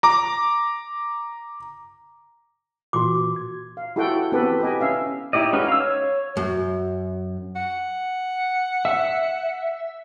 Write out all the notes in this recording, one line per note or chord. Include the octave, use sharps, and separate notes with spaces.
A#5 D6
A#2 E3 F4 F#4 D6
G#6
F5
E4 F#4 G4 A4 F#5 G5
B3 C4 G4 A4 B4
G4 B4 D#5 G#5
C#4 E5 F5
D#4 E4 G4 D5 D#5
G#3 C#4 D#4 F#4 B4
F5 E6
C#5
F#2
F#5
E5